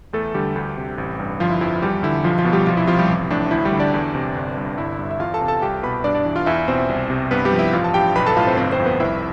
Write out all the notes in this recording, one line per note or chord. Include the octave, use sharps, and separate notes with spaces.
E2 A3 A4
D3 G3 G4
D2
C3
A1
G2
G1 F3 F4
E4
F2 E4
E2 G3 G4
D3 E4
B1 F3 F4
F3 F4
B2
G3 G4
C2 F3 F4
E4
C3 F3 F4
G3 G4
A1
A2 D4
D2 E4
G3 G4
D3
D4 D5
E2
C3
G1
G2
G1 E4 E5
G2
E5
E2 F4 F5
A4 A5
C3
A4 A5
C2 G4 G5
B2 B4 B5
G2 D4 D5
D4 D5
E3
F4 F5
E2 E4 E5
B2 C4 C5
C2
C3
G2 B3 B4
G3 G4
F3
E4 E5
A1 F4 F5
A5
G2 G4 G5
B1 B4 B5
A4 A5
A2 F4 F5
C4 C5
G1 C4 C5
C4 C5
F2
B3 B4
C2 E4 E5